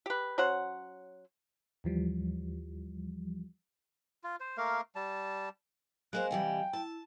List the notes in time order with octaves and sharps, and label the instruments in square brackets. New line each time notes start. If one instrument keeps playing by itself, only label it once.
[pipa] G4 B4
F#3 C#4 C5 F#5
[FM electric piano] D#2 E3 F3 G3
[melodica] F4
C5
A3 A#3 A#4 F5
G3 A5
[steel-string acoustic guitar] G#3 A#3 C5 [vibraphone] D#5 F5 G#5 [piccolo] F#6
[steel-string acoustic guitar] C3 E3 G3 [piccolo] G5
[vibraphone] E4 [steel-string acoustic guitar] A5